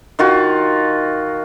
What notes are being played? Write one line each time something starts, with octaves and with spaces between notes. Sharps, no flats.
D#3 F4 F#4